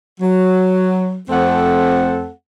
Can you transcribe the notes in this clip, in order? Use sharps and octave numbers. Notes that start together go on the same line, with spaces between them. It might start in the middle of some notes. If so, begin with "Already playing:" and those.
F#3
F2 A3 C4 A4 F#5